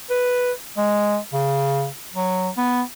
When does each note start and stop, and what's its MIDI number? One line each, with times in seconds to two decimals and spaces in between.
0.10 0.52 71
0.77 1.17 56
1.33 1.88 49
2.14 2.49 54
2.57 2.81 59